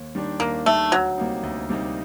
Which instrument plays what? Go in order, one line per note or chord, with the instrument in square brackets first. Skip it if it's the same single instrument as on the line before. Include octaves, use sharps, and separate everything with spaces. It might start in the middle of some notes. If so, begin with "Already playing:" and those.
Already playing: [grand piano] D#2
D#3 G3 D4
[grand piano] D#2 [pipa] A#3
[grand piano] D#3 G3 D4 [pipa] A3
[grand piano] D2 [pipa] F#3
[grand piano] C3 G3 A#3 D#4
D2
C3 G3 A#3 D#4